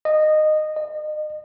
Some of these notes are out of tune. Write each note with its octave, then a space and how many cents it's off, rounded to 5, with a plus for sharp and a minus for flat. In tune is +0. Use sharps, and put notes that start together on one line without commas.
D#5 -15
D#5 -35